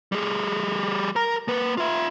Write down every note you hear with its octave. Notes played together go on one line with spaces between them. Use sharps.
G3 G#4
A#4 A#5
A#3 B4
F4 E5